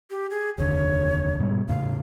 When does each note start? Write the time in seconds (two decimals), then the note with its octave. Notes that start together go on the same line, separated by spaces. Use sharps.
0.10 G4
0.30 G#4
0.58 F1 D#2 D3 C#5
1.39 G#2 B2 G3
1.69 E2 A2 C#3 F5